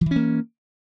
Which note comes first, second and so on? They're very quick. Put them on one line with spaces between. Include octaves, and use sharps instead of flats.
F3 E3 C#4 A#3